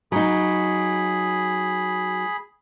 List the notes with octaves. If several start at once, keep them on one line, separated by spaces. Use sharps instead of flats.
F#3 D#4 G#4 B5